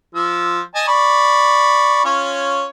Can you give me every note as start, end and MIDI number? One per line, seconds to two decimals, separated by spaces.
0.15 0.60 53
0.15 0.60 88
0.75 0.83 75
0.75 0.83 80
0.75 0.83 81
0.88 2.00 74
0.88 2.00 83
0.88 2.00 85
2.05 2.65 61
2.05 2.65 65
2.05 2.65 73